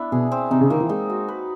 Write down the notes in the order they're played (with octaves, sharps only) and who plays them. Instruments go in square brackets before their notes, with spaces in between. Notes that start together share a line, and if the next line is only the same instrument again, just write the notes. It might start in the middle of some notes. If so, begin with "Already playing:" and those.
Already playing: [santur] B3 D4 E4 B4
[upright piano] B2 [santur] G#4
[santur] C4
[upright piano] C3 [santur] D#4
[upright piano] C#3
[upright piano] D#3 [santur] A#3
[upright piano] E3
[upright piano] G#3 [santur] D#4
[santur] F#4
B4